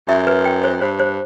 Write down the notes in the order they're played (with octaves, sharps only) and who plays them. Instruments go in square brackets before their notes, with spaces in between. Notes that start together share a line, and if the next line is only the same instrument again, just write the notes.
[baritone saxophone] F#2 [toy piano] E5
[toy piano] B4
G5
C5
[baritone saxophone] G2 [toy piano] C5
[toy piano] C5